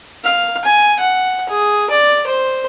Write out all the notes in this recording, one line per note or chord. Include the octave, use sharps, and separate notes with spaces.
F5
G#5
F#5
G#4
D5
C5